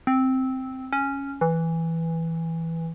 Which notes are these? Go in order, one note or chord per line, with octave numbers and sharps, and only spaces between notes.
C4
C#4
E3